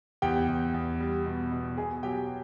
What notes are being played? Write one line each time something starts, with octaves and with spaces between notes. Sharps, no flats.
E2 G4 G5
E2
E2
G3
B2
B2
B2 G#4 G#5
F#3 G4 G5